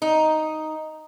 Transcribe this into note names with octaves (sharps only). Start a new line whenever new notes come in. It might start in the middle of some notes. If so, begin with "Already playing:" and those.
D#4